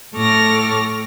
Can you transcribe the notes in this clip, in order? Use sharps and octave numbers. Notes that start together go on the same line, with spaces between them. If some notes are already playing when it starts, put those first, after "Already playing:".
A2 A4 C#6 D6 F6 A#6